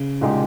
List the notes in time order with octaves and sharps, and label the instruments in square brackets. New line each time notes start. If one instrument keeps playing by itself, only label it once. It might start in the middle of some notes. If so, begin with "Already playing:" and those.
Already playing: [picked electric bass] C#3
[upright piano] C2 A#2 G#3 D#4 G4